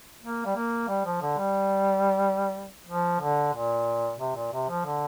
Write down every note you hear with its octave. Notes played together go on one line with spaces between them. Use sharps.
A#3
G3
A#3
G3
F3
D3
G3
F3
D3
A#2
C3
A#2
C3
F3
D3